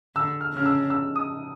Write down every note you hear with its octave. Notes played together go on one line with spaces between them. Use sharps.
D3 E6
F6
C#3 F6
E6
E6
D#6